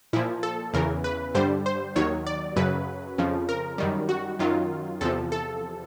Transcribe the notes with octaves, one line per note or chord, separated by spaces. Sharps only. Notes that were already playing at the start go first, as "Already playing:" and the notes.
A#2 F3 E4
A4
E2 C#3 E3 A#4
B4
G2 D3 G3 C5
C5
D#2 D#3 F#3 C#5
D5
F#2 C#3 F#3 B4
F2 C#3 F3
A#4
F#2 D#3 G3
F#4
F#2 D#3 F#3 F4
E2 C3 F3 A4
A4